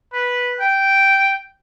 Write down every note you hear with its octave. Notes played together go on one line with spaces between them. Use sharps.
B4
G5